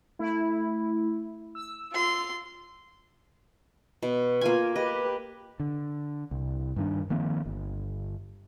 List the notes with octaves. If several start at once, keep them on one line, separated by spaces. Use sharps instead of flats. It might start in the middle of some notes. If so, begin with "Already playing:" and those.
A3 E4
E6
F4 C6
B2
A#3 F4 G#5
G4 B4 D#5
D3
C2
G2 D#3 D4
D#3 F3 A#3 C4
G1